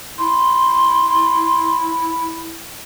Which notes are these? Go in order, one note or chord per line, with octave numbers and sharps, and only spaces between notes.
E4 C6